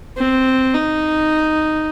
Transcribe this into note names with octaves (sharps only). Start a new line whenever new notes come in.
C4
D#4